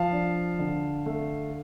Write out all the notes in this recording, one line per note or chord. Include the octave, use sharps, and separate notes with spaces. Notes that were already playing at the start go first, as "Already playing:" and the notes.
Already playing: F3 F5 A5
D4
D3
A3